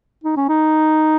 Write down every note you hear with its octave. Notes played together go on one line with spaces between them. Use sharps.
D#4
C#4
D#4